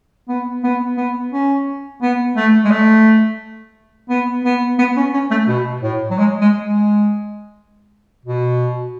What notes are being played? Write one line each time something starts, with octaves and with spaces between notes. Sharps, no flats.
B3
B3
B3
C#4
B3
A3
G#3
A3
B3
B3
B3
C#4
C#4
A3
B2
A2
F#3
G#3
G#3
G#3
B2